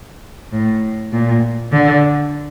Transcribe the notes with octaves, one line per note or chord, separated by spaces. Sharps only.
A2
A#2
D3